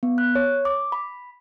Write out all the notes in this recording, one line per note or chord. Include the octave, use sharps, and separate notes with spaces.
B3
F#6
C#5
D6
B5